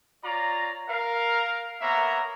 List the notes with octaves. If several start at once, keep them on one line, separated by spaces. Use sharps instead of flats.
F4 C#5 D5 A#5
A#4 F5
A#3 B3 A#4 C#5 E5 A#5